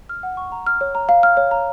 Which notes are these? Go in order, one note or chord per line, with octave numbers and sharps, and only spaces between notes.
F6
F#5
C#6
A#5
F6
C#5
A#5
F5
F6
C#5
A#5